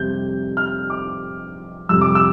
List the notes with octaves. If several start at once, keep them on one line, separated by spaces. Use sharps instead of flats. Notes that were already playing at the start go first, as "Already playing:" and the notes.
Already playing: F2 C3 G3 C4 G6
F6
D6
F2 C3 G3 E6
D6
E6